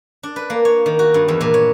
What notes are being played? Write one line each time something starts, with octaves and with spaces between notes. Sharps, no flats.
D4
B4
A#3
C#5
D#3
F#4
G2
E2
A#2
C#5